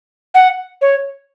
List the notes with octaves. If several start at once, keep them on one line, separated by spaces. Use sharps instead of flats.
F#5
C#5